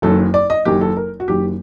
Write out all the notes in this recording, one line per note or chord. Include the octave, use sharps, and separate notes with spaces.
F#1 F#2 D#3 F#3 A4
D5
D#5
F#1 F#2 D#3 F#3 G4
A4
A#4
F#4
F#1 F#2 D#3 F#3 G4